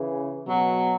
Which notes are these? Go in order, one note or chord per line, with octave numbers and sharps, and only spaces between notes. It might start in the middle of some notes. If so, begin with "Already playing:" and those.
Already playing: C#3 E3
B2 F#3